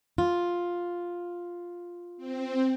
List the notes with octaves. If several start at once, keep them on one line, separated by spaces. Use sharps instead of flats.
F4
C4